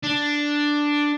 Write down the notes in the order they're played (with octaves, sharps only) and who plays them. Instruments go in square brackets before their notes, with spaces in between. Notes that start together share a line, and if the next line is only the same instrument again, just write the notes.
[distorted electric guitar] D4